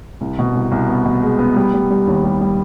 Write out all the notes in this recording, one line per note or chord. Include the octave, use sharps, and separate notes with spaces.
C2
B2
C2
C2
B3
B2
G#3
B3
G3
G3
G3
D#2
G3
G3